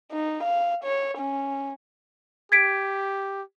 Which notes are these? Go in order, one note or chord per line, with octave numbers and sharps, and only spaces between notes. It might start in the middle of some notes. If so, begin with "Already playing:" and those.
D#4
F5
C#5
C#4
G4 G#6 B6 D7